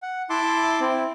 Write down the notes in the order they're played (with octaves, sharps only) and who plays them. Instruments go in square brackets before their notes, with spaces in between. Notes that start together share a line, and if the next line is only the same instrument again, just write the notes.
[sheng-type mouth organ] F#5
E4 E5 A5 C6 D6
C4 E4